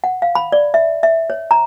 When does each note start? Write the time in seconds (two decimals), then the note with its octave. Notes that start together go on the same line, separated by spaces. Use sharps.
0.04 F#5
0.22 F5
0.35 B5
0.52 D5
0.74 E5
1.03 E5
1.30 C#5
1.51 A#5